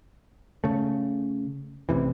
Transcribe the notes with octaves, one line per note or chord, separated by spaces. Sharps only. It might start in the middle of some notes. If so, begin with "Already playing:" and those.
C#3 A3
A1 C3 E3